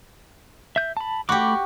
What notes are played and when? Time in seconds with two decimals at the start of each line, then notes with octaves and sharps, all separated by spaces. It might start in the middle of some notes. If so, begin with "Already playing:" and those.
0.76 E5 G6
0.97 A5 B5
1.29 A3 F#4 G4 B5 D6